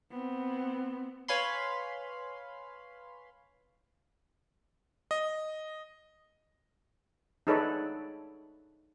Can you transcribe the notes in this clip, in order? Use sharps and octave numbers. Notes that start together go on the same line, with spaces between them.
B3 C4
B4 C#5 F5 G#5 B5 C6
D#5
D#4 G#4 A4 B4 C#5 D5